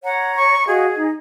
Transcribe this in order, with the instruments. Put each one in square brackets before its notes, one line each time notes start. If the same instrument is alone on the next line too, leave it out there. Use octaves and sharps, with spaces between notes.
[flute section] C#5 A#5 [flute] F#5
[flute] C#6
[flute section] F#4 D#5 F5 [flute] G#4
[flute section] D#4